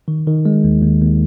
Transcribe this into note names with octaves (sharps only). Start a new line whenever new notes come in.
D#3
D#3
G#3
D#2
D#2
D#2